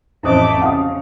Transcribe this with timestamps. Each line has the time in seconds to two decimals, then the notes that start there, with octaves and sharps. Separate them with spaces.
0.23 A1 F2 A3 E4 C5 D#5 D6 D#6
0.62 C#3 F5 D#6